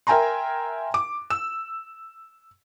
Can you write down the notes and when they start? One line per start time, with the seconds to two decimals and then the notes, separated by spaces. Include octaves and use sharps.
0.07 A#4 E5 G5 G#5 A#5 C6
0.94 D6
1.30 E6